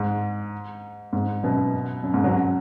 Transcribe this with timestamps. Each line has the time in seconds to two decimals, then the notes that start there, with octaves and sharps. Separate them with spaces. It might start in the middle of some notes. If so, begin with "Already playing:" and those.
Already playing: G#2
1.13 G#2
1.43 F#2 B2
2.03 F#2
2.14 G#2
2.24 C#3 F#3